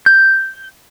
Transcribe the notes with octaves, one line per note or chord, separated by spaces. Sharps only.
G6